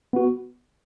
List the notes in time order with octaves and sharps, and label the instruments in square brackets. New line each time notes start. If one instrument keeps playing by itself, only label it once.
[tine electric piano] B3 F#4